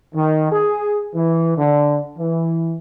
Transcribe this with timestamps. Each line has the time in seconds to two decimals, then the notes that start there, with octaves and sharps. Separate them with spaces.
0.14 D#3
0.52 G#4
1.15 E3
1.57 D3
2.18 E3